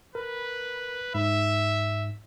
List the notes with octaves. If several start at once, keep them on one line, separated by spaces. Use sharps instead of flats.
A#4 B4
G#2 E5